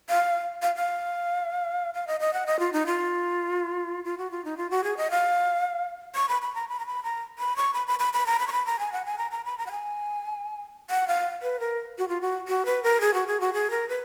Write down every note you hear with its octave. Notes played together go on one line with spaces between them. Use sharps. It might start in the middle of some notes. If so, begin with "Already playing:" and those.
F5
F5
F5
F5
D#5
D#5
F#5
D#5
F4
D#4
F4
F4
F#4
F4
D#4
F4
F#4
G#4
D#5
F5
C#6
B5
B5
A#5
B5
A#5
B5
A#5
B5
C#6
B5
B5
B5
B5
A#5
B5
C#6
B5
A#5
G#5
F#5
G#5
A#5
A#5
B5
A#5
F#5
G#5
F#5
F5
B4
A#4
F#4
F4
F#4
F#4
B4
A#4
G#4
F#4
G#4
F#4
G#4
A#4
B4